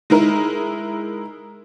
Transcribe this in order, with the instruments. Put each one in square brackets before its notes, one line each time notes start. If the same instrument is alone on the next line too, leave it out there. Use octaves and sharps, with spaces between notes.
[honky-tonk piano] G#3 D#4 E4 A#4